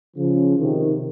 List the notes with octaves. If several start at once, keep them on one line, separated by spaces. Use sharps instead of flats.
C#3 F3
C3 D#3